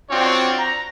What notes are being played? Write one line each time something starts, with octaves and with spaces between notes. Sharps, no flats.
C4 D4 F4 F#4 C#5 D5
A#5